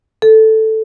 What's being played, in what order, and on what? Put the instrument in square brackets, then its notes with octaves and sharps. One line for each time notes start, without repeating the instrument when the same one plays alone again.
[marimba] A4